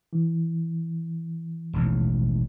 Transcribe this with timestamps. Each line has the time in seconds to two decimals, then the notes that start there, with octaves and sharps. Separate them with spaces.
0.13 E3
1.73 E1 A1 D#2